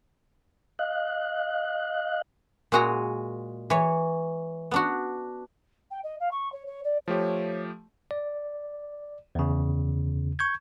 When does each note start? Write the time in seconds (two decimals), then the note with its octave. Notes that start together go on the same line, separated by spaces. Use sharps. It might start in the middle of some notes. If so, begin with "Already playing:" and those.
0.79 D#5 F5 F#6
2.72 A#2 G#3 F#4 G#4 A#5
3.70 E3 C#5
4.71 B3 D4 F#4
5.90 G5
6.03 D#5
6.19 F5
6.31 C#6
6.52 C#5
6.66 C#5
6.83 D5
7.08 F3 A3 G4 C#5
8.11 D5
9.35 E2 C#3
10.39 C#6 G6 G#6